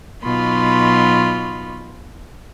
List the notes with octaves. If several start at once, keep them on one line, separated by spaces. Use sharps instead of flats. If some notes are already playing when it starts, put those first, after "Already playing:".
B2 F#3 D#4 F4 B5 C6